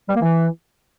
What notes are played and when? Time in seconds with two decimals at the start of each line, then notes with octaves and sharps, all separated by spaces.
0.09 G3
0.15 A#3
0.22 E3